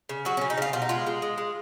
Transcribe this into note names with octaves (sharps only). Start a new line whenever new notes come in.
C#3
F#3 F#4
C#4
C#3
D#4
C#3 F4
B2 F4
D#4
G#3 F4
G#3
G#3
G#3